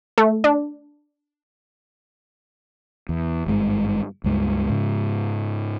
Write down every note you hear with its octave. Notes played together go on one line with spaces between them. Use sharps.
A3
D4
E2
G#1 G2 G#3
C#2 G2 G#3
G#2 C#3